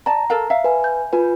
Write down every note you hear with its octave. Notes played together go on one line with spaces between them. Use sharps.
D5 A5 A#5
A4 A#4 F5
E5 F5
B4 G#5
G6
F4 B4 G#5